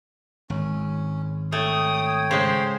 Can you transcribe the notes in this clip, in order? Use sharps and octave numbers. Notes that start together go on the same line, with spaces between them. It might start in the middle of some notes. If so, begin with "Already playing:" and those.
G#1 C#4
A3 C#5 G5 D#6
C#3 G#3 C5